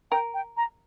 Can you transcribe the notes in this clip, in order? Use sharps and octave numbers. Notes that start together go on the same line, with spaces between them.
A#4 G5
G5
A#5